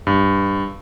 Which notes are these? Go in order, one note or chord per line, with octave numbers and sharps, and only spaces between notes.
G2